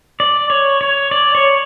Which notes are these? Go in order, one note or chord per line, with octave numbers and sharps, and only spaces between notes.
D5
C#5
C#5
D5
C#5